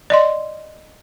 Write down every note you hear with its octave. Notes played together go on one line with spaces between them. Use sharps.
D5 D#5 C6